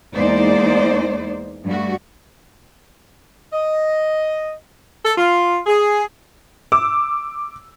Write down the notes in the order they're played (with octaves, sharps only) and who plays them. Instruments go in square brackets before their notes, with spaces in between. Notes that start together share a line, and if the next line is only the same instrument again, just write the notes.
[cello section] E2 G#3 A#3 D#4 C5 D5
G2 G3 A3 F#4
[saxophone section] D#5
A4
F4
G#4
[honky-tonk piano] D6 E6